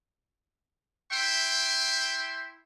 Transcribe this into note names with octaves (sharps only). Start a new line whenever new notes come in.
E4 E5 G5 C6